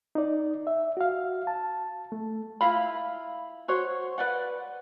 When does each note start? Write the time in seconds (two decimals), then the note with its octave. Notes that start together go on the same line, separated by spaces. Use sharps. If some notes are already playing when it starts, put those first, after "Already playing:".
0.15 D#4 D5
0.67 E5
0.97 F#4 F5
1.47 A5
2.12 A3
2.61 E4 F4 F5 B5
3.68 F#4 C5 C#5
4.18 B4 D5 F#5